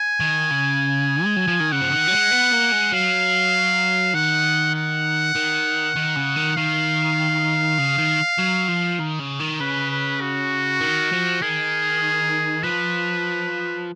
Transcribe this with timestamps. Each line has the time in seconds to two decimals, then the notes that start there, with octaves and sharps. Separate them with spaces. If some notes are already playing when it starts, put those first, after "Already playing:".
Already playing: G#5
0.20 D#3
0.51 C#3
1.24 G#3
1.36 F#3
1.48 F3
1.60 D#3
1.72 C#3 F#5
1.82 F3
1.92 D#3
2.08 F#3
2.12 G#3
2.32 B3
2.53 A#3
2.73 G#3
2.92 F#3 F5
4.14 D#3 F#5
4.75 F#5
5.35 D#3
5.96 D#3
6.16 C#3
6.36 D#3
6.56 D#3 F5
7.79 C#3
7.98 D#3
8.39 F#3
8.68 F3
9.00 D#3
9.20 C#3
9.40 D#3
9.60 C#3 B4
9.90 B4
10.21 F#4
10.81 D#3
11.12 F3
11.42 D#3 G#4
12.63 F3 B4